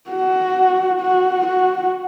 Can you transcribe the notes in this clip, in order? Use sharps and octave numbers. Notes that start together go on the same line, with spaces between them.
F#4
F#4
F#4